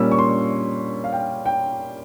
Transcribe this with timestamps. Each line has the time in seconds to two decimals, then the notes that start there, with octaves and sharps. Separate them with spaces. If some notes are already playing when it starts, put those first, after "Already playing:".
Already playing: A#2 G3 A#3 C#4 E6
0.11 C#6
0.19 C6
1.04 F5
1.13 G5
1.46 G5